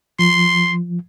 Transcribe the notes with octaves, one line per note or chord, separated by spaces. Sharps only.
F3 C6